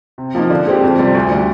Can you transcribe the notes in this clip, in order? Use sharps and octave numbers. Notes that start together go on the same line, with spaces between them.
C3
F3 A#3 D#4
D3
G#3 C4 G4
F2
C3 G3 C4
D2
D3 G3